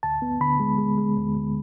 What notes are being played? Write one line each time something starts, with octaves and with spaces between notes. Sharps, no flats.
D2 A5
B3
D3 B5
G#3
G#3
G#3
D2
D2